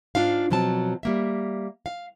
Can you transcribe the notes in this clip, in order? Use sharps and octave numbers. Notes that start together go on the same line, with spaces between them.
G#2 D4 F4 F5
B2 F3 F#3 C4 A5
G3 A#3 E5
F5